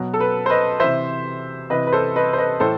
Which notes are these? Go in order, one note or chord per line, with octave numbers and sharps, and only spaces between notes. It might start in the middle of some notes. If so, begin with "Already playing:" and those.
Already playing: B2 F#3
A4
B4
C5
B4 D#5
C3 E3 C5 E5
C3 E3 B4 D#5
B4
A4 C5
B4 D#5
C5
B4 D#5
A2 E3 A4 C5